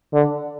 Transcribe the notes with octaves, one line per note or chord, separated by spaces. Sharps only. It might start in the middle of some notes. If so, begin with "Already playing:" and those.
D3